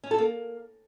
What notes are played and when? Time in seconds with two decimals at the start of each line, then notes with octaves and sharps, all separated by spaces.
0.04 C#4
0.11 A4
0.18 A#3